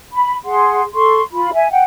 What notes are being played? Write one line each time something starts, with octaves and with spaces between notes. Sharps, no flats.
B5
G#4 F#5 C6
A4 C6 C#6
F4 B5
E5 G#5
F#5 G5